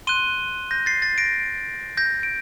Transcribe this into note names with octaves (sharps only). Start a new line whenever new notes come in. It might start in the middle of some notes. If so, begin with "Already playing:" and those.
C6 F#6 D#7 G7
G6 A#6
A6 C7
A6 C7
A#6 D7
G6 A#6
D7